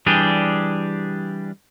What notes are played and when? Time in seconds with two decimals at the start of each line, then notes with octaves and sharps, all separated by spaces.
0.06 E3 G3 D4 G4 G#4